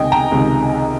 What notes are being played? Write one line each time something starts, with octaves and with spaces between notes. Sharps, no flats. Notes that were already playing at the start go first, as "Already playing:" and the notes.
Already playing: C#2 C3 D#3 D#5 G5 G#5
G5 A#5
C#2 C3 D#3